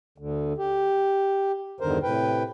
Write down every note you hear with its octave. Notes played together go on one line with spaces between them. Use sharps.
D2 D3
G4
E2 G2 D3 D#3 A#4 C5
A2 C3 B4 G5